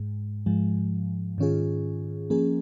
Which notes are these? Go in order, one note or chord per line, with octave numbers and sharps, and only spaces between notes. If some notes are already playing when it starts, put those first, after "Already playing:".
Already playing: G#2 G#3
G#2 F3 G#3
G#2 D#3 C#4 F4 G#4
F3 A#3 C#4 G#4